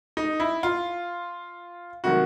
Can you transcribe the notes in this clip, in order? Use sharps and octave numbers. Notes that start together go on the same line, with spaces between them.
D#4
E4
F4
C3 D#3 F#3 F#4